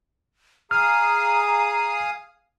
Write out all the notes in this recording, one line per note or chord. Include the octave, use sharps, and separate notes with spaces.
G#4 F5 A#5 D#6 F6